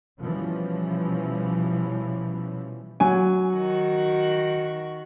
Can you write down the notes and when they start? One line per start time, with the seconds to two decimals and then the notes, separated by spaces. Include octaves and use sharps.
0.22 B2 E3 F3 G3 C#4
3.00 F#3 G#5
3.53 D#3 F#4